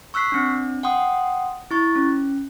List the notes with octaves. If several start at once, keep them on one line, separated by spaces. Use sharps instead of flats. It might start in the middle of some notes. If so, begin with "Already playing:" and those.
C#6 E6 F#6 B6 C7
C4 D4
F#5 G5 C6 D#6
E4 C#6 A6
C#4